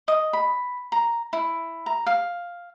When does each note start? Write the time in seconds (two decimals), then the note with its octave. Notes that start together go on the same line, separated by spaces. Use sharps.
0.08 D#5
0.33 B5
0.92 A#5
1.33 E4
1.86 A#5
2.06 F5